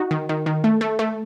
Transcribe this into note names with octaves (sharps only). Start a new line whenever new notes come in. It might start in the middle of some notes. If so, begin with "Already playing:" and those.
Already playing: D#4 F#4
D#3
D#3
D#3
A3
A3
A3